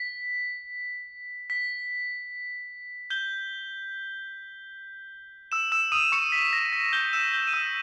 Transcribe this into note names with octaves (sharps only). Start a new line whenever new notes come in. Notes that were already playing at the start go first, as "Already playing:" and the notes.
Already playing: B6
B6
G6 G7
E6 E7
E6 E7
D#6 D#7
C#6 C#7
B6
A#6
B6
G6 G7
E6 E7
G6 G7
D#7
E6 E7